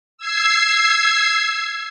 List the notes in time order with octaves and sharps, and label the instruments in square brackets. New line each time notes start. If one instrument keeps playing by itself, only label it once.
[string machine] E6 G#6 C7